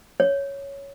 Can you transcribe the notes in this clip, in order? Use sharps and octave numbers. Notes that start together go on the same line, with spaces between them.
C#5